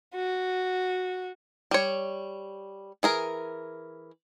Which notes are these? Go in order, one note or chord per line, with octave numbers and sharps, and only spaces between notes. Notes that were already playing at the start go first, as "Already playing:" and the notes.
F#4
G3 C#5
E3 G#4 A#4